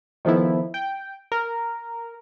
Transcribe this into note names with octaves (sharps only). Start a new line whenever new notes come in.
D#3 F3 A3 B3 E4
G5
A#4